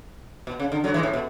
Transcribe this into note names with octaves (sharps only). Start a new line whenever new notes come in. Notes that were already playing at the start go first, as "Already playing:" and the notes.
B2
C#3
D3
D3 F#3
E3 G#3
A2
B2